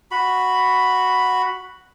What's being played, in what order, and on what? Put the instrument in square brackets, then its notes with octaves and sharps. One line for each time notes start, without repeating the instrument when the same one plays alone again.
[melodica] F#4 B5